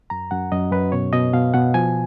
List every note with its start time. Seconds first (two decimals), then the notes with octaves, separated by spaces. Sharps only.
0.10 F#2 A#5
0.31 F#2 F#5
0.52 F#2 D#5
0.72 F#2 B4
0.92 B2 C#5
1.13 B2 D#5
1.33 B2 F5
1.54 B2 F#5
1.74 F3 G#5